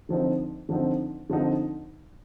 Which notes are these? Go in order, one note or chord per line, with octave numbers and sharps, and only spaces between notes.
D3 F3 C4 D#4
D3 F3 C4 D#4
D3 F3 C4 D#4